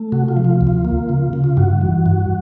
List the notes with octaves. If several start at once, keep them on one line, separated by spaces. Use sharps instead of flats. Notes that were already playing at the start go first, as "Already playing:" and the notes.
Already playing: A3
C3 F#4
F4
F3
F4
D2
F4
A#3
C#3
C#3
F4
G2 F#4
E3
G2